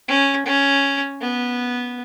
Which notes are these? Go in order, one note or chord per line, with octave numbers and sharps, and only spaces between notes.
C#4
C#4
B3